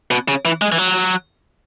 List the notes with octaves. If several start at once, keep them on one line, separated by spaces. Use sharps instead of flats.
B2
C#3
E3
G#3
E3
F#3